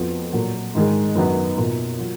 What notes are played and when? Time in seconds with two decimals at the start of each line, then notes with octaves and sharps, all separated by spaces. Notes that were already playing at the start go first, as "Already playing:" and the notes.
Already playing: F2 F3 B3 F#4
0.33 A#2 F#3 A#3
0.75 G#2 D#3 G#3
1.15 F#2 D#3 F#3 B3
1.56 B2 A#3 F4
1.99 F#3 F4